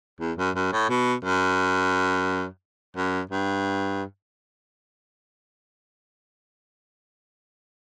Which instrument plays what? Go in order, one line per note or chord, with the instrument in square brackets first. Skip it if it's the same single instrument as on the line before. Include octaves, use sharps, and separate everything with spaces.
[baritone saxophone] E2
F#2
F#2
A2
B2
F#2
F#2
G2